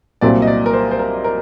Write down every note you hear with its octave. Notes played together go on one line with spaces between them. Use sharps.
C2 A#2 F#3 C4 D5
D#5
D5
A#4
C5
C5
A#4
A#4